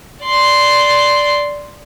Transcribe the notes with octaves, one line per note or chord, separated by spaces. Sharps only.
D5 C6